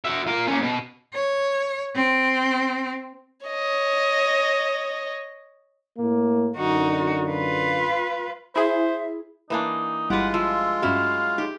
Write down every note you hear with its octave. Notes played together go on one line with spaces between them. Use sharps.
F#4 E5
F4 A#4
A#3 C#4
B2
C#5
C4
C#5 D#5
A2 A#3
F#2 D3 D#4 F#4
F4 B4
E4 G#4 C5 E5
E3 A#3 D4 D#4 B4 G#5
G1 G3 G#3 E4 F4 G4 B4 F#5
F3 E5
G2 F#3 C#4 E4 F#4 F5
D#4 G4 G#4